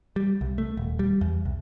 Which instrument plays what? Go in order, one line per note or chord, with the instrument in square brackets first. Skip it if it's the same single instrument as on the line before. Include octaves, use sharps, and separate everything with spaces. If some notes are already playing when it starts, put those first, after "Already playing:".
[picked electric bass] G3
C2
A3
D#1
G3
E2
C2